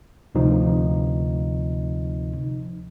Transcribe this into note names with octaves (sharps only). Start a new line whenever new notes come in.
D2 C3 F3 D#4